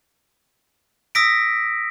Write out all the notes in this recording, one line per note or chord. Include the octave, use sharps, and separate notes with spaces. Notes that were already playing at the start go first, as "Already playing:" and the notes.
D#6 E6 A#6 B6 D7